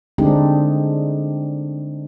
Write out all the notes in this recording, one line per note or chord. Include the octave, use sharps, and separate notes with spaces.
D3 G#3 C4 D4 D#4 G4